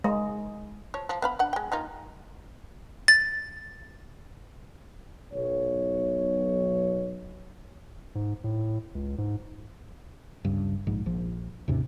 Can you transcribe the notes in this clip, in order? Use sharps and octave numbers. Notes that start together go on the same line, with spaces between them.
G#3
F3 C#5
F3
B3 F5 B5
D4 F#5
G#3 G5
A#3 D#4 F4
A6
B1 C#5
G#2
A2
C#2
G#2
G1 C#2 G2
A#1 G#2
A#1 F3
D#2 G#2 C3 C#4